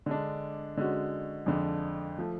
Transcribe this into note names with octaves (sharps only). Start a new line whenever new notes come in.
D3 G#3 D4
D3 G#3 C#4 F#4
F2 D3 G#3 D4
F3 A3